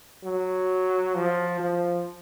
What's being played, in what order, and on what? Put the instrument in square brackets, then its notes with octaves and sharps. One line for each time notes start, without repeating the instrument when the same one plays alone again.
[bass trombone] F#3
F3
F3